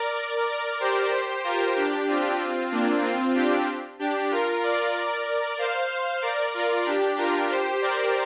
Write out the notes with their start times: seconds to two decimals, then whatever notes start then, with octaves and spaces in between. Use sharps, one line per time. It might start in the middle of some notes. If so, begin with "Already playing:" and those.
Already playing: A#4 D5
0.16 A#4 D5
0.48 A#4 D5
0.80 G4 C5
1.44 F4 A#4
1.76 D4 G4
2.08 C4 F4
2.72 A#3 D4
3.03 C4 F4
3.35 D4 G4
3.99 D4 G4
4.30 F4 A#4
4.63 A#4 D5
5.58 C5 F5
6.22 A#4 D5
6.54 F4 A#4
6.86 D4 G4
7.18 F4 A#4
7.50 G4 C5
7.82 A#4 D5